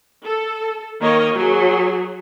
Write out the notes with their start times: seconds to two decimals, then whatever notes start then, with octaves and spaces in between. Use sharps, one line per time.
0.24 A4
1.01 D#3 A#3 A#4 C#5 D#5
1.34 F#3 G#4